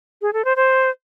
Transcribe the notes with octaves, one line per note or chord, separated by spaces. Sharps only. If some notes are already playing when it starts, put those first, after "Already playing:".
G#4
A4
C5
C5